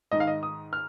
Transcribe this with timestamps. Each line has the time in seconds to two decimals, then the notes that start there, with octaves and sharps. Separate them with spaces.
0.11 G#2 D#3 D#5
0.20 F5
0.27 D#5
0.43 D#6
0.73 F6